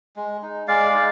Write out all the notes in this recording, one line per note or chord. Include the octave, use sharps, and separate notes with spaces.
G#3
D#4
G#3 D5 F5
D#4